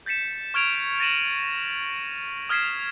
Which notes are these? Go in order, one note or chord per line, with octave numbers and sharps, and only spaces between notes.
G6 A6 B6 C#7 E7
C#6 F6 G#6 D7 F7
A6 A#6 D#7 E7 F#7
D#6 F6 G#6 B6 C7 E7